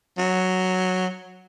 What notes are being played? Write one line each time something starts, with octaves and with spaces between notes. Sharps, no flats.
F#3